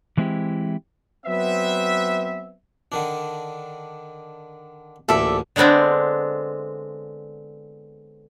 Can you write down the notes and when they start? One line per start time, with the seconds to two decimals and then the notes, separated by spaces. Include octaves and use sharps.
0.17 E3 G#3 C4 E4 G4
1.26 F#3 B3 C4 B4 E5
2.92 D3 D#3 D4
5.09 A1 D2 A#2 A4 D5 E5
5.56 D3 G#3 B3 C4 D4